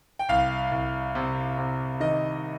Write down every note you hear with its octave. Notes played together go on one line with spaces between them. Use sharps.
G5
C2 F5
C2
C3
C3
D#3 D#5